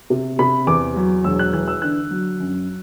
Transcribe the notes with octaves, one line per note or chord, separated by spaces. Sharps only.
C3
C3 B5
E2 D6
F#3
E1 E6
F#6
E3 F#6
E6
D3 F#6
F#3
F#2